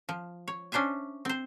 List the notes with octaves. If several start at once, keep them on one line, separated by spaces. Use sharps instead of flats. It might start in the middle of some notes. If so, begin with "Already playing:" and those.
F3
C#5
C#4 D4 C5 E5 G#5
C4 C5